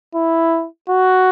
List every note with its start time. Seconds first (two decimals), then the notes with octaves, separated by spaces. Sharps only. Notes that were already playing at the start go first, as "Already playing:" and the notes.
0.15 E4
0.89 F#4